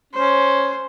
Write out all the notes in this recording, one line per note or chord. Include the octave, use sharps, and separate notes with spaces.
C#4 C5